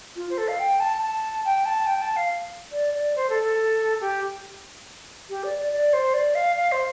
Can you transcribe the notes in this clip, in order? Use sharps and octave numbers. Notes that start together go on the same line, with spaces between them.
F4
C5
A4
F5
G5
A5
A5
G5
A5
G5
A5
F5
D5
D5
C5
A4
A4
G4
G4
D5
D5
D5
C5
D5
F5
F5
C5